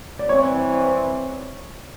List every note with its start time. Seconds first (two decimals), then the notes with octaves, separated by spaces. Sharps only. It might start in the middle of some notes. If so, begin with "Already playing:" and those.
0.19 D5
0.29 E3 G3 C4 C#5